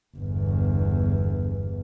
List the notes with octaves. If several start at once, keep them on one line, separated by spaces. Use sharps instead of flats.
G1 E2